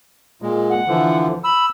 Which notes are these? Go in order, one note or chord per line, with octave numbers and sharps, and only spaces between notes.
A#2 G#3
F#5
D3 E3 F3
B5 E6